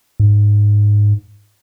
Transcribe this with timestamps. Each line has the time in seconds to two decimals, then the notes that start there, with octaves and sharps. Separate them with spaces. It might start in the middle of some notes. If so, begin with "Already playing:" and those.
0.20 G#2